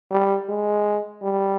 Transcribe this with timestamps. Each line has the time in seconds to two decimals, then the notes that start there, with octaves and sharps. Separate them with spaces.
0.12 G3
0.49 G#3
1.23 G3